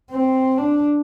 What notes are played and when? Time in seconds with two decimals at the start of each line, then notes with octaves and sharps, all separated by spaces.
0.12 C4
0.58 D4